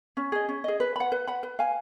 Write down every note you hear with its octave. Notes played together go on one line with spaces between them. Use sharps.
C#4
G#4 D#5
C#4
G#4 D#5
B4
F#5 B5
B4
F#5 B5
B4
F5 G#5